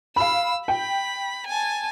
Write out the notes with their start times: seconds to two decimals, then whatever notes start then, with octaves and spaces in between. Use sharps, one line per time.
0.16 F5 B5 E6
0.68 G5 B5
1.47 G#5 A5